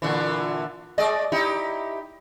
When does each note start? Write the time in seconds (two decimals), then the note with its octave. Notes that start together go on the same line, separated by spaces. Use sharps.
0.02 A#2 D3 E3
0.98 G#3 D5 D#5
1.32 D#4 E4 G4